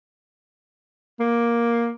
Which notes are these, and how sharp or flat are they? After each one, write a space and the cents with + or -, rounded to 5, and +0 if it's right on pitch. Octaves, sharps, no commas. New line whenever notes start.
A#3 +10